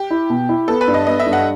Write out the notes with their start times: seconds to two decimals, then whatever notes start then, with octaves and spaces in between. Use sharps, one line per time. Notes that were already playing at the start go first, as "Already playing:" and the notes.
Already playing: G4
0.11 E4
0.30 B2
0.49 E4
0.68 B3 A4
0.81 B4
0.88 G2
0.94 D#5
1.07 B3 D#5
1.20 E5
1.26 G2
1.33 F#5